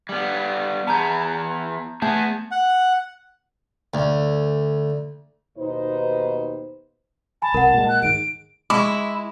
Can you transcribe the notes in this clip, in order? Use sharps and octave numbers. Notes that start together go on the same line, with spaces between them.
G3 B3
E2 B3 A5 A#5 G6
A3 B3 G#4 A5 G6
F#5
D2
D#2 B2 D#4 B4 C5
G#5 A5 B5
C2 A#4 F#5
A#2 G#3
F#6
G#2 D#3 G#3 D7
G#3 E4 C#6 D6